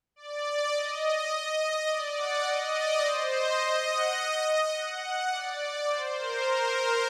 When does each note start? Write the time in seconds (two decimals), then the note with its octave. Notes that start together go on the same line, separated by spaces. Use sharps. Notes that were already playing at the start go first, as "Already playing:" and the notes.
0.16 D5
0.72 D#5
1.30 D#5
1.87 D5
2.16 F#5
2.45 D#5
2.73 D5
3.03 C5
3.30 D#5
3.87 F#5
4.16 D#5
4.45 D#5
4.73 F#5
5.31 D5
5.59 D5
5.89 C5
6.17 A#4